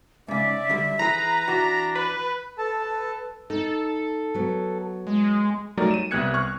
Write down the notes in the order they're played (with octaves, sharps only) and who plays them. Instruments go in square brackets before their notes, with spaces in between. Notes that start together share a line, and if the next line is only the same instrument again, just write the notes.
[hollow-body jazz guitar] G#2 C#3 [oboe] D5 [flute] E5
[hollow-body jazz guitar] D3 G3
[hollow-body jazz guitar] E3 G#4 [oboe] B4 [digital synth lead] A#5 [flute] B5
[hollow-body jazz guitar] E3 F#4 [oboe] D4
[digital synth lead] B4
[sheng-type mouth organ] A4 A5 [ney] B4
[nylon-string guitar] D#4 [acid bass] A4
[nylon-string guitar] F#3 B3
[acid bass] G#3
[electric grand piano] F#3 G3 A3 D#4 A#4 D5
D#7 E7
C2 G3 B3 F#6 G#6 C#7
C#6 F6 F#6